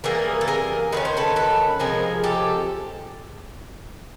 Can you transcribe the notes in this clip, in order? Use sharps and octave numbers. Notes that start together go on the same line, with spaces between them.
E3 G3 A#3 G#4 A#4
A4
G#4 A#4
D#3 G#3 C#4 B4
C5
A4 B4
A4 B4
C3 F3 G#3 G#4 A#4
G4 A4